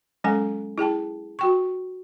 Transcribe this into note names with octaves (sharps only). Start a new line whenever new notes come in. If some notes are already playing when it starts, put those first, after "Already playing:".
F#3 G#3 C#4 A4 F#5 G#5
E4 G#4 G5 A5
F#4 G5 C#6